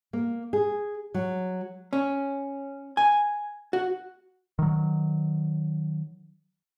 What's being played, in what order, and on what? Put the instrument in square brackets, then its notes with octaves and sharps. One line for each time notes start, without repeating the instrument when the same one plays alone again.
[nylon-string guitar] A#3
G#4
F#3
[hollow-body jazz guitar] C#4
G#5
F#4
[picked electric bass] D#3 F#3